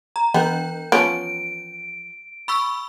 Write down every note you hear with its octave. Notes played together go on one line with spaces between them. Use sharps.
A#5
E3 B3 G5 G6
F3 B3 C#4 D7
B5 C#6 E6